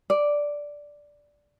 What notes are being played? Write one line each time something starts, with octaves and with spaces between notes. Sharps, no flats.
D5